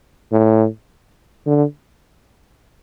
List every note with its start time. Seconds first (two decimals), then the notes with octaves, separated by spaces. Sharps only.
0.32 A2
1.47 D3